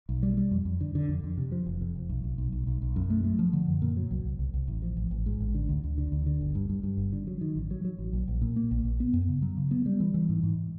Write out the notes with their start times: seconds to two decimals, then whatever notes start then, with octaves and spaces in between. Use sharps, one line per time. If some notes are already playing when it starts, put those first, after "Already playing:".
0.09 B1
0.23 G3
0.37 G3
0.51 F2
0.65 F2
0.81 D3
0.95 D3
1.09 F2
1.24 F2
1.37 C3
1.52 F3
1.66 F1
1.81 F2
1.95 F1
2.09 B1
2.24 B1
2.38 B1
2.52 B1
2.67 B1
2.82 B1
2.96 F#2
3.10 A3
3.24 A3
3.39 F3
3.53 D3
3.68 F#2
3.82 A#2
3.97 F#3
4.11 C2
4.25 C2
4.39 C2
4.54 C2
4.68 A1
4.82 F3
4.97 A1
5.11 A1
5.26 G#2
5.40 A1
5.55 D3
5.69 D2
5.84 D2
5.98 D3
6.12 D2
6.26 D3
6.41 G1
6.55 G2
6.70 G2
6.83 G2
6.98 G1
7.12 D3
7.27 F#3
7.41 D#3
7.56 A1
7.71 F#3
7.85 F#3
7.99 A1
8.13 A#1
8.28 A#1
8.42 A#2
8.56 A#3
8.71 A#1
8.85 A#1
9.00 B3
9.13 F#2
9.29 C#3
9.42 F#3
9.57 C#3
9.71 B3
9.86 G3
10.00 E3
10.14 E3
10.29 G#2
10.43 G#2